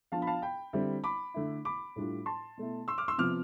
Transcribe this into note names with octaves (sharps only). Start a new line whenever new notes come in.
F3 B3 D4 F4 F5 A5
B5
F5 A5
G5 B5
D3 G3 C4 E4
B5 D6
D3 A3 E4
B5 D6
A2 G3 D4 F4
A5 C6
B2 A3 E4
C6 E6
D6 F6
C6 E6
C3 F3 B3 F4 D6 F6